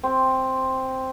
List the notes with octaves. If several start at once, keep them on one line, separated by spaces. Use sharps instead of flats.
C4